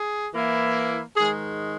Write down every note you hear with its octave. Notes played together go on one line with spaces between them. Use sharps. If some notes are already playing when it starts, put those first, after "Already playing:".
Already playing: G#4
E3 A#3 E4
G#2 D#3 G#3 G#4